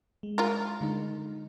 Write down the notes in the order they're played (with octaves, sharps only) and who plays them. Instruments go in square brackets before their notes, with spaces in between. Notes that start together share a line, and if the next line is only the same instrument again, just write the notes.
[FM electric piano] G#3
[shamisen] F4 A#4
[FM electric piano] D3 G#3 D#4